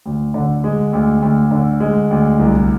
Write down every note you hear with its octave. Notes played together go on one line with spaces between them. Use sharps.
D2
D3
G#3
D2
D2
D3
G#3
D2
C2